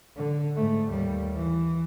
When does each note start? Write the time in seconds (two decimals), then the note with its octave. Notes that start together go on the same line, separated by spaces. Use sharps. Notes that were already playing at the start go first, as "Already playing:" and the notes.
0.16 D3
0.55 G#2 A3
0.90 D#2 G3
1.35 E3